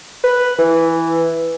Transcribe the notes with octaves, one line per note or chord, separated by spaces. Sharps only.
B4
E3